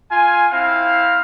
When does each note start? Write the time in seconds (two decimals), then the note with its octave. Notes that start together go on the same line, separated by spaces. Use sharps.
0.11 F4 G#5
0.52 C4 E4 F5